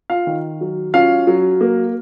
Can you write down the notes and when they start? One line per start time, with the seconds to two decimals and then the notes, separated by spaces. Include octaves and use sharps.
0.10 F4 F5
0.27 D#3
0.61 F#3
0.94 C#4 F4 F5
1.27 F#3
1.61 A#3